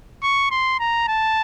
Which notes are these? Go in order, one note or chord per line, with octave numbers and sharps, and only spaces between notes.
C#6
C6
A#5
A5